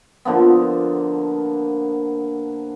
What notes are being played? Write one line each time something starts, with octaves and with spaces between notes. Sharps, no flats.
D3 F3 A#3 B3